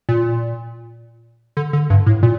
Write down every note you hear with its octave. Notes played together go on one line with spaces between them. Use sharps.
A#2
D3
D3
G2
A2
A#2